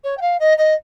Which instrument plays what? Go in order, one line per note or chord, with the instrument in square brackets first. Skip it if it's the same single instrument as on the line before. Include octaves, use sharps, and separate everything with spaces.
[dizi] C#5
G5
F5
D#5
D#5